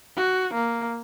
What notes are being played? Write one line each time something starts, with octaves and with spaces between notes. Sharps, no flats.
F#4
A#3